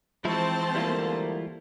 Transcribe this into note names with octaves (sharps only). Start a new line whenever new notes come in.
E3 F3 G#3 C4 E4 C5 A5 C#6
D2 G3 A#3 E4 F4